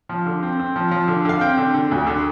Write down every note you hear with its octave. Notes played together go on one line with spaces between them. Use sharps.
F3
D3
C4
C4
F3
F3
D3
D3 F5
C4 G5
D3
D3
D2
D3